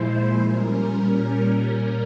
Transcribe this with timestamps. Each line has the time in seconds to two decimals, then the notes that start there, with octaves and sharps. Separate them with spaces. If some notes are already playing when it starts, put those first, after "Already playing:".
Already playing: A#2 F3 G#3 E4 C5
0.39 A#2 G3 C#4 A#4